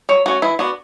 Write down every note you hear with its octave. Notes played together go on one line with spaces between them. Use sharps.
F#3 C#5
A3 C#4 F#4
E3 E4
B3 D4 F#4